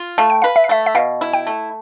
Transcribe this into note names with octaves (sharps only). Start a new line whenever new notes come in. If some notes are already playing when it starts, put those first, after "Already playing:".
Already playing: F4
A3 F5
G5
B4 F5
E5
F5
A3 E5
E5
B2 F5
E4
G5
A3